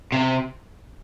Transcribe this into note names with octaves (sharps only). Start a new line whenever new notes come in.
C3